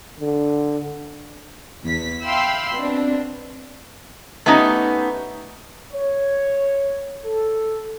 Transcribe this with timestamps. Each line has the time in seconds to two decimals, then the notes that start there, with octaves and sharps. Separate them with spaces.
0.20 D3
1.83 E2 B6
2.24 E5 F5 G5 B5 C6 E6
2.74 B2 C4 D4
4.46 A3 B3 C#4 D#4 G4
5.93 C#5
7.25 A4